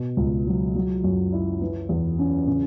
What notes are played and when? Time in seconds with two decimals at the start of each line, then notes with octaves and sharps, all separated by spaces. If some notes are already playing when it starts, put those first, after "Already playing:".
Already playing: B2
0.17 C#2
0.46 F#3
0.75 F#3
1.04 F#2
1.32 E4
1.62 E3
1.89 E2
2.19 C#4
2.47 C#3